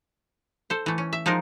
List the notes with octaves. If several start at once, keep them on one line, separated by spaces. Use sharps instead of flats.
A4 C5
E3 A3
C#4
E5
F3 G#3 D#4 F4 A#4